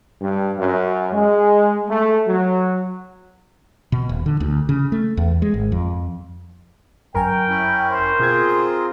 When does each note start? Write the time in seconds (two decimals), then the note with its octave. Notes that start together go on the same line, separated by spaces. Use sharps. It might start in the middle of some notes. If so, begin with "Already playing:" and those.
0.20 G2
0.58 F#2
1.13 G#3
1.89 A3
2.27 F#3
3.92 B2
4.09 D#1
4.26 D3
4.40 D2
4.69 C#3
4.92 A3
5.17 E2
5.42 G#3
5.54 G#1
5.72 F2
7.14 G1 F#2 A#4 G5 G#5
7.49 C#4 E4
7.90 C5
8.20 B2 C4 F4 G#4 G#6
8.50 D#6